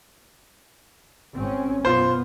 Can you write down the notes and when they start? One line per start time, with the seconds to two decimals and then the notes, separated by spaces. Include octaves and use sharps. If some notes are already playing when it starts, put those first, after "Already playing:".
1.34 G#1 C4 C#4
1.85 F#2 B2 B3 F4 C5